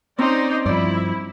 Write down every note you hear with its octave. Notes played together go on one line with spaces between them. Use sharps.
C4 C#4 D#4 C5 D5
G2 F3 E4 D5